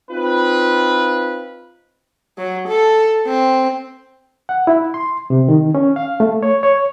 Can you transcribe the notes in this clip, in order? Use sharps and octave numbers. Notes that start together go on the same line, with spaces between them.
C4 D#4 F4 B4
F#3
A4
C4
F#5
E4
C6
C3
D#3
C#4
F5
A3
C#5
C#5